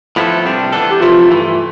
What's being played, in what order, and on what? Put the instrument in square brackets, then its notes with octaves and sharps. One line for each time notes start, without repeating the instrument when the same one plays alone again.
[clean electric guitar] A2 F3 B3 E4 A4
C2 C3 G3 D4
E3 B3 D4 A4
[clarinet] G4
[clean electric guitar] F2 C3 E3 A3 E4 [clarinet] F4
[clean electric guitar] G2 E3 A3